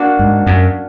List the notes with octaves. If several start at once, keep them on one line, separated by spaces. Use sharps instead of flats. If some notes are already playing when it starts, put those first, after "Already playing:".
Already playing: A#3 D4 F#4
G#2
F#2